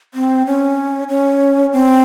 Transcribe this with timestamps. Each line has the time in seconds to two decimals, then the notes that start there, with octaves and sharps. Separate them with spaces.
0.14 C4
0.47 C#4
1.09 C#4
1.73 C4